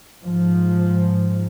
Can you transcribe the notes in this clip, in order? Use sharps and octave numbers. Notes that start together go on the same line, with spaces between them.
G#2 F3